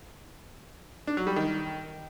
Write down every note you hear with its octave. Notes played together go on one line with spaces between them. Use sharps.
D4
F#3
G3
D#3